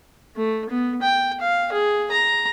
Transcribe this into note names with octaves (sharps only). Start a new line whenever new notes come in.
A3
B3
G5
F5
G#4
A#5